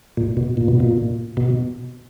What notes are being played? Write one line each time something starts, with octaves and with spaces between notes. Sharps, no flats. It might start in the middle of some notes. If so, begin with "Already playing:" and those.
A#2
B2
A#2
B2
A#2
B2